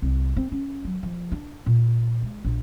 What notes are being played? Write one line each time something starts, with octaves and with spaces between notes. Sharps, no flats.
C2
C4
C#4
F#3
F3
D4
A#2
G#3
A#1